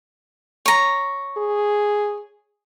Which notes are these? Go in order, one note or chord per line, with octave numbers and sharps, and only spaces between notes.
C#5 A#5
G#4